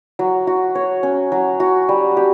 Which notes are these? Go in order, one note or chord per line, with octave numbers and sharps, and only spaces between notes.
F#3
F#4
C#5
C#4
F#3
F#4
G3
G4